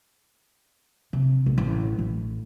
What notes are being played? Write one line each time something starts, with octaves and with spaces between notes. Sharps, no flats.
C3
A#1
A1
A1